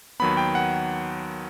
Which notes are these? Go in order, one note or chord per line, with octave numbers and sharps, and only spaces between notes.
D#2 D#3 F#3 B3 B5
G5
F#5